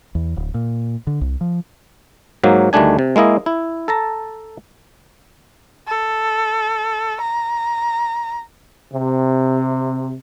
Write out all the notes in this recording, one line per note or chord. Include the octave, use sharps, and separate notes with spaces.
E2
D1
A#2
D3
C2
F3
G#2 F#3 A#3
D2 D#3 G3 A3 D4 G#5
C3
G#3 A#3 E4 D#5
E4
A4 A5 A#5
A4
A#5
C3